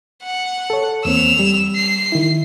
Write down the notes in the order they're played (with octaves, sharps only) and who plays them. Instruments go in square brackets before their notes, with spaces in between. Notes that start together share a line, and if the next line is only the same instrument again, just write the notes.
[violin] F#5
[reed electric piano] A4 C#5
[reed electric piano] E2 A#3 C4 [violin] E6 F7
[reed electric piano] G3
[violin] C7
[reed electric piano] D#3 E4